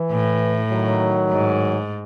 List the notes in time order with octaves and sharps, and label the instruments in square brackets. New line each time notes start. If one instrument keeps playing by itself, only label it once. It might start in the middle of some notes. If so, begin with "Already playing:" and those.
Already playing: [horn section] E3
[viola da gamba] A2
[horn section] D#3 F#3
[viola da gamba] G#2